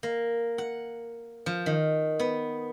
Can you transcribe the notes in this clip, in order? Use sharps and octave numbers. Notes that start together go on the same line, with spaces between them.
A#3
F#5
F3
D#3
B3